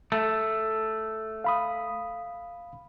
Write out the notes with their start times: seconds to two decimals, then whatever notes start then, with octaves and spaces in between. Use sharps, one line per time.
0.12 A3
1.44 F5 B5 D#6